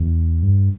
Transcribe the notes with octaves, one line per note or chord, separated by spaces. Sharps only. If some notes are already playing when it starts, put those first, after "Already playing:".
Already playing: E2
G2